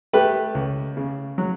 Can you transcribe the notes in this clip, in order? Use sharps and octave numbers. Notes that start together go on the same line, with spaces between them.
A3 G4 B4
C#2
C#3
F#3